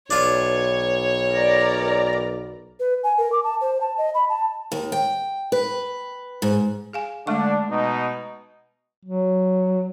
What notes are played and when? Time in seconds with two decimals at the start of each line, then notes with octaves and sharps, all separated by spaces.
0.10 B1 D4 F4 C#5
1.31 A#4 D5 A#5
2.80 B4
3.04 G#5
3.18 A#4
3.32 D6
3.44 A5
3.61 C5
3.81 A5
3.98 D#5
4.14 B5
4.29 A5
4.72 D#2
4.92 G5
5.52 B4
6.42 G#2
6.93 G#4 F5 G#5
7.27 D3 G#3 A3 D4 C#6
7.70 B2 D#4
9.05 F#3